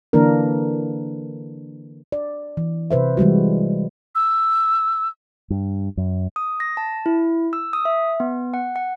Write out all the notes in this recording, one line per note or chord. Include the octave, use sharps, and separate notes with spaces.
D3 E3 A#3 D4 A#4
D5
E3
C3 B4 C5 E5
E3 G3 G#3 F#4
E6
G2
F#2
D#6
A#6
A5
E4
E6
D#6
E5
B3
F#5
F#5